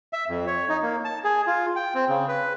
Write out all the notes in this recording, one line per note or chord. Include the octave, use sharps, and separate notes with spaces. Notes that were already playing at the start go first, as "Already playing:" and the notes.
E5
F2
C#5
D#4
A#3
A5
G#4
F4
G5
C4
C#3
B4